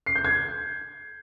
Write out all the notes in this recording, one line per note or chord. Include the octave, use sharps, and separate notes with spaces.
C7
G6
G#6